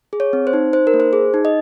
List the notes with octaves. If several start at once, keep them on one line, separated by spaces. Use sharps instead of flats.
G#4
C#5
C4
C5
D#4
D#4 C5
A#4
A#3
C5
G#4
D#4
D#5